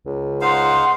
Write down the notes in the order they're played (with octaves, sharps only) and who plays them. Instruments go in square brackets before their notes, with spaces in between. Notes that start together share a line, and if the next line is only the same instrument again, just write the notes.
[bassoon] C#2
[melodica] D#4 C5 F5 [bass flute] F#5 [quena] C6